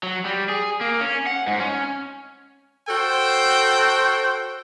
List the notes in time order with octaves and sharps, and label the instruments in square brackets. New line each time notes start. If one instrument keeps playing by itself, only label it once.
[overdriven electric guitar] F#3
G3
G#4
A#3
C#4
F#5
G#2
C#4
[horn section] F#4 A4 C5 G5